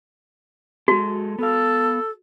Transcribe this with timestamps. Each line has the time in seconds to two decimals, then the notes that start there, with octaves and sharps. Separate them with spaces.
0.88 G#3 F#4 A4
1.39 B3 A4 F5